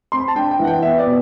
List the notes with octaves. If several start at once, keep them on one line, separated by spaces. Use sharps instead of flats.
C4 C6
B5
A5
D4 G5
G5
E3 F#5
G5
B3 E5
D5
B2